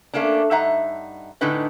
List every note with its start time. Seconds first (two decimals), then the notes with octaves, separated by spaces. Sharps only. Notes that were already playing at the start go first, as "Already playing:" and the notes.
0.14 A3 A#3 C#4 D4
0.51 G2 D#4 E5 F#5 A#5
1.41 A2 D3 C#4 D#4 B4 D#5